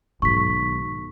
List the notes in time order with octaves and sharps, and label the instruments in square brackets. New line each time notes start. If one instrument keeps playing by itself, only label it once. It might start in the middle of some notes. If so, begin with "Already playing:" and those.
[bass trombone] B1 [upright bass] G#2 D#3 [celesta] C#6 B6